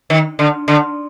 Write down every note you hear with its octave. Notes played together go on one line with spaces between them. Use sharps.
D#3
D3
D3